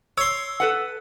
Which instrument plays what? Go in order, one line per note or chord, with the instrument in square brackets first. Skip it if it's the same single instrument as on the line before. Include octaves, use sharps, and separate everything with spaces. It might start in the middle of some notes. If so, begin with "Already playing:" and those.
[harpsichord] C#5 C6 [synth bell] E6
[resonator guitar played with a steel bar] A4 B4 F#5